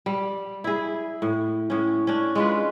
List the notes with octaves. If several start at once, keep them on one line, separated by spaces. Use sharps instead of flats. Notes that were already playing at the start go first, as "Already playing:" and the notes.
G3
E4 G#4
A2
A2 C#4
C#4 D4
G#3 F4 B4